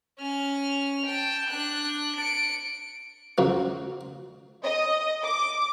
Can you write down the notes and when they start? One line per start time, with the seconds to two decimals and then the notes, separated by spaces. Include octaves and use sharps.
0.18 C#4 F6
1.06 G5 A5
1.50 D4 F#6
2.17 C#7 D7
3.38 F2 C#3 F#3 A#3
4.65 D#5
5.23 D6